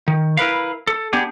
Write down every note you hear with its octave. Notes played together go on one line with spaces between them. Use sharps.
D#3
E4 A#4 B4 F5
A4
B3 D4 G4 G#4